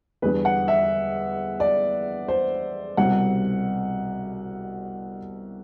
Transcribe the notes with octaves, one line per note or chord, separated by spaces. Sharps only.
E2 D3 G3 B3 B4
F#5
E5
D5
C5
C2 B2 G3 C4 F#5